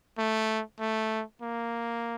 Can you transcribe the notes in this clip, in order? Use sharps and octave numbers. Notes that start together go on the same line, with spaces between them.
A3
A3
A#3